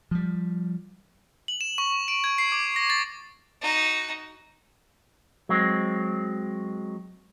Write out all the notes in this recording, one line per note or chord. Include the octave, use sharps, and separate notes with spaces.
F3 G3
F#7
E7
C#6
D7
G#6
C7
D6
A#6
A6
D#4 F#4
F#3 G#3 C4